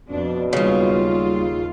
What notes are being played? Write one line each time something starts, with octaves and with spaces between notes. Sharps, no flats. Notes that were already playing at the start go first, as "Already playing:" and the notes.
F2 B2 D4
D#2 C#3 F#3 G3 F4